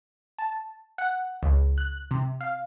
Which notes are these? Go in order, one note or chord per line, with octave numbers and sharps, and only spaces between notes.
A5
F#5
C#2
F#6
C3
F5